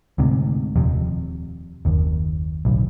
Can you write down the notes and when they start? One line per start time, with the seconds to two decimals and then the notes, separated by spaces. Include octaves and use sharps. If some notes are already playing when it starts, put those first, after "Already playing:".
0.18 D2 G#2 C3
0.76 D#1 F2 C3
1.85 F#1 D#2
2.65 D1 B1